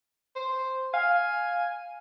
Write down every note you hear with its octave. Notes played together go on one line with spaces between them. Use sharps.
C5
F5 G#5